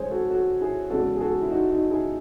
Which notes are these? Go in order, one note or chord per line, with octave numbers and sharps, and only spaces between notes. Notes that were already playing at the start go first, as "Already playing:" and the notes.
Already playing: F#2 E3 G#3 G#4 C5 C#5
F#4 A4
F#4 A4
E4 G#4
E2 C#3 G#3 F#4 A4
G#4
F#4 A4
E4
D#4 F#4
D#4 F#4
E4 G#4